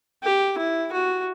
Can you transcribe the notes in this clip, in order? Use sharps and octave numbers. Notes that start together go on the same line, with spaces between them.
G4
E4
F#4